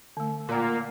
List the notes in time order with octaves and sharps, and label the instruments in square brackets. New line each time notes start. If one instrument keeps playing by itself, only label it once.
[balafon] D3 A3
[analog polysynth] A#2 [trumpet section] A#3 [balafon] D5 F#5